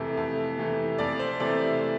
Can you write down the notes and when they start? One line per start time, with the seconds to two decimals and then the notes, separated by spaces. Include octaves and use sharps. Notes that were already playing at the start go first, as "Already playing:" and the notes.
Already playing: F2 C3 E3 A3
0.17 F2
0.58 C3 E3 A3
0.98 F2 D5
1.19 C5
1.40 C3 E3 A3 D5